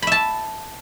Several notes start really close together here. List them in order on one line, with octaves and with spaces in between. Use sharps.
B5 E5 A5